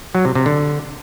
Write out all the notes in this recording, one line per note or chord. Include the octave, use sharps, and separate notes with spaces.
F#3
C3
C3
D3